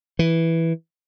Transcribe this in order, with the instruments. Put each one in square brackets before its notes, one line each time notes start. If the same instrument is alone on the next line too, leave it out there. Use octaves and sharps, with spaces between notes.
[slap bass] E3